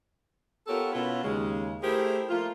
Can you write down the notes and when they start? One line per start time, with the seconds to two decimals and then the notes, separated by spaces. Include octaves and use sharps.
0.67 B3 F4 G4 A4 A#4 C#5
0.93 B2 B3 C#4 E4 F4
1.24 D#2 C#3 G#3
1.83 A3 E4 G4 G#4 A#4 C5
2.30 F3 A3 A#3 F4